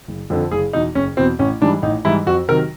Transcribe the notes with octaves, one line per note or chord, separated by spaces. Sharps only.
F#1
F2 D3 F3
F#1 G#4
E2 B2 D#4
F#1 C#4
E2 B2 C4
A1 C#4
G#2 E3 G3 D4
A1 D#4
G#2 E3 G3 E4
F2 F#4
C3 D#3 F#3 A#4